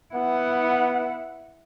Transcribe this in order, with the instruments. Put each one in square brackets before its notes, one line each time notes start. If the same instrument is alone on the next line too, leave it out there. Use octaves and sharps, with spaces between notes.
[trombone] B3 [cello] E4 F#5